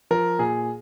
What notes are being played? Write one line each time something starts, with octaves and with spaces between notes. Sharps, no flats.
F3 A#4
A#2 G#4